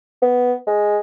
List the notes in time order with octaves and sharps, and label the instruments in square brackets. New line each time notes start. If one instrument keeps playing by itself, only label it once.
[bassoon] B3
G#3